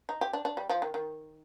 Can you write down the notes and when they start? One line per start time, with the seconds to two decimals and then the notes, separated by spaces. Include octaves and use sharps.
0.09 D#4
0.21 G4
0.33 D4
0.45 D4
0.57 G3
0.69 F3
0.82 D#3
0.94 D#3